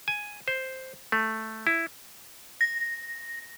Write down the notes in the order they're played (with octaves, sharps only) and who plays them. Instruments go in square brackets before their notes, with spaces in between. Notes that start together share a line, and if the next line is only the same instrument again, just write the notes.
[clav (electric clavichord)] G#5
C5
A3
E4
[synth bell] A#6